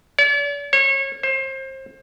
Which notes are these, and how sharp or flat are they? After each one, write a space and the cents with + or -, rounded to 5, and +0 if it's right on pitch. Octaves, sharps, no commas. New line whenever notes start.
D5 -45
C#5 -30
C5 +30